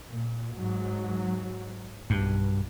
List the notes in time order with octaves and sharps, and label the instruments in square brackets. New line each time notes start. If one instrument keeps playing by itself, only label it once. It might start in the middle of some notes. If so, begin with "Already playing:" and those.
[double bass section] A#2
G#2 F#3
[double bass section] B1 B2 [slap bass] G2